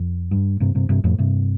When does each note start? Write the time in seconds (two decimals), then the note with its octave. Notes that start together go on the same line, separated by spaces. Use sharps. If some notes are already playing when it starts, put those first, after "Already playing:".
Already playing: F2
0.31 G2
0.60 G2 C3
0.75 G2 C3
0.89 G2 C3
1.04 F2 A2
1.18 G2 C3